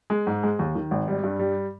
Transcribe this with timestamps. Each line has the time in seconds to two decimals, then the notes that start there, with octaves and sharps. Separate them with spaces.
0.10 G#3
0.27 G#2
0.43 G#3
0.59 D#2
0.75 D#3
0.91 G#1
1.08 G3
1.24 G2
1.39 G3